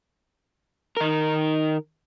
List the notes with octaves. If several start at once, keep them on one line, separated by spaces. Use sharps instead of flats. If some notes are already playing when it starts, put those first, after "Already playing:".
D#3 A#4